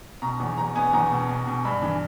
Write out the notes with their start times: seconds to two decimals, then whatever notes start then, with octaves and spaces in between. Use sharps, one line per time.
0.22 B2 A#5
0.40 E2
0.57 E2 A#5
0.75 B3 G#5
0.93 E2 A#5
1.11 B2
1.29 B2
1.47 B2
1.65 G2 B5
1.82 E3